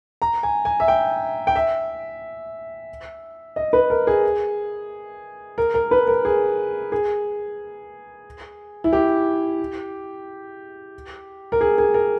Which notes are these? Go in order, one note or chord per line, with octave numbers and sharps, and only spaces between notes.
A#5
G#5
G#5
E5
G5
G5
E5
D#5
B4
A#4
G#4
A#4
A#4
B4
A#4
G#4
G#4
E4
G4
A#4
G#4
G#4
A#4